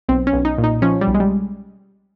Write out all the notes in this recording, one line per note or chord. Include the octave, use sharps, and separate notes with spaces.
B1 C4
C#4
B1
D#4
A#2
D#4
F3 C#4
G3
B1
G#3
G3